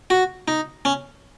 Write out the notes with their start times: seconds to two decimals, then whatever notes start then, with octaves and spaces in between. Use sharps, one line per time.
0.10 F#4
0.48 D#4
0.85 C#4